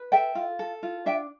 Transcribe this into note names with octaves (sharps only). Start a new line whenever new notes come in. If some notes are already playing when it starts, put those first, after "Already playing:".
Already playing: B4
A4 E5 G5
F4
A4
F4
D4 E5 G5